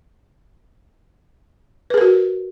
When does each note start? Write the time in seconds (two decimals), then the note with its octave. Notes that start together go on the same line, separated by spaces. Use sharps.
1.90 B4
1.94 G#4
1.98 A#4
2.01 F#4